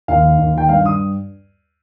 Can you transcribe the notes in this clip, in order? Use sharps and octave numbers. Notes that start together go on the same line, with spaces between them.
D#2 F5
D#3
D#2
D#3 G5
G2 F5
G2 D#6